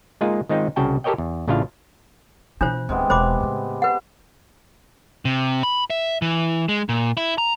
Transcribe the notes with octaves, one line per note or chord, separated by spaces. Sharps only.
G#3 A#3 D#4 F4 G#4
D#3 G#3 C4 D#4 F4
C2 C#3 F#4 G5 A5
G4 A4 A#4 C#5 D#5 G5
E2
A1 C#3 D4 E4 F4 F5
B2 E3 D4 F4 C5
D1 C3 D#3 G#3 B3
E1 C5 B5 D6
A2 C#3
B4 F#5
C3
B5
E5
E3
G#3
A#2
E4
A#5